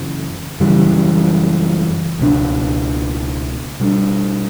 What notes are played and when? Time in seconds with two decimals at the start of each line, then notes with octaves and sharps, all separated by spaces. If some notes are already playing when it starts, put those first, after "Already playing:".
Already playing: F#2 C#3 E3
0.60 F#2 C#3 E3 G3
2.19 C#2 B2 A3 D4
3.80 B2 G3 D4